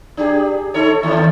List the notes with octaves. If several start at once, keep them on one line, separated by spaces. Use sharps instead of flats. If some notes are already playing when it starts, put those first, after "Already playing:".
D4 G4 G#4
D#4 A4 C#5
D#2